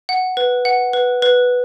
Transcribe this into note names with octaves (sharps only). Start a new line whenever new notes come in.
F#5
B4
F#5
B4
B4